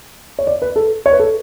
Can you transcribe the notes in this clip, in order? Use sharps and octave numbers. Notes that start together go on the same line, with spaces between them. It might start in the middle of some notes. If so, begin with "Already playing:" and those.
C#5
D5
B4
A4
C#5
B4
A4